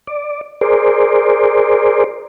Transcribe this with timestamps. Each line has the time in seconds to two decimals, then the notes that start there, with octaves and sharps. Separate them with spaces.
0.07 D5
0.61 G#4 A#4 C5 D5